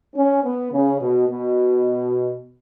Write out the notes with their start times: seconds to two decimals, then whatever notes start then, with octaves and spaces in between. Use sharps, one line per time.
0.16 C#4
0.44 B3
0.73 C#3
1.01 B2
1.30 B2